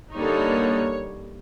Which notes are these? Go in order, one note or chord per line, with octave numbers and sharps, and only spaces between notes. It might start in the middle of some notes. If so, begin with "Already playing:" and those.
D3 G3 A#3 D#4 C#5